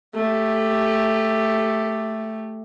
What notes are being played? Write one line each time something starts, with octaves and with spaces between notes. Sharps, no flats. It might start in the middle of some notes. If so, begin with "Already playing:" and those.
A3 G4